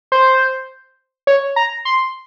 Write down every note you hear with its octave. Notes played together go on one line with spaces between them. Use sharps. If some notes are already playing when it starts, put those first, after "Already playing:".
C5
C#5
A#5
C6